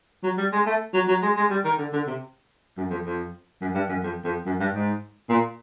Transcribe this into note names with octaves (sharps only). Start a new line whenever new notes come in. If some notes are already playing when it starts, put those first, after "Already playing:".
F#3
G3
G#3
A3
F#3
F#3
G#3
G#3
G3
D#3
D3
D3
C3
F#2
F2
F2
F#2
G2
F#2
F2
F2
F#2
G2
G#2
A#2